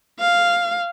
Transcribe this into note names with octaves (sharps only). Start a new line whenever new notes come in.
F5